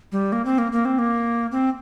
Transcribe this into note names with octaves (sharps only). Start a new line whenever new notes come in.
G3
A#3
C4
A#3
A#3
C4
A#3
C4